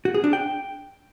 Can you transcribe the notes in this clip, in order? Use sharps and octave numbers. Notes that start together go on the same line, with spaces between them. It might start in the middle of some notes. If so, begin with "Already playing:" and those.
F#4
G#4
D4
G5